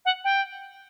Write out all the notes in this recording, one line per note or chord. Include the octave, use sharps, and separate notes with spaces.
F#5
G5